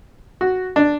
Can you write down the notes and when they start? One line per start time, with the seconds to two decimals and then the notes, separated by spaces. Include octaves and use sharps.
0.41 F#4
0.76 D4